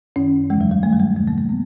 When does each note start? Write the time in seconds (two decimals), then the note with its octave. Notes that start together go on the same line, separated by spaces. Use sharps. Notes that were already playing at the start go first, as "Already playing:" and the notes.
0.16 F#2 D#3 C#4
0.50 E2 C#3 E3 G#3
0.61 F#3
0.71 G3
0.83 G2 D#3 A3
0.92 G3
1.00 G#3
1.16 E2 C3 D#3 A3
1.28 A#3
1.38 A#3
1.49 F3 B3